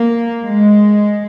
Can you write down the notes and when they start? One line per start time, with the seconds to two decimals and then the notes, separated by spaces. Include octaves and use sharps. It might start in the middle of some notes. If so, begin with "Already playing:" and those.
Already playing: A#3
0.47 G#3